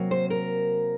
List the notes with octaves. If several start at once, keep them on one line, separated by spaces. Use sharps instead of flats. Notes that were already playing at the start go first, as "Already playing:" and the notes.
Already playing: C3 F#3 A#3
C5
A#4